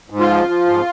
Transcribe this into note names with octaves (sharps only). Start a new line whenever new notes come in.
G#2
F4
F3
F3
G#2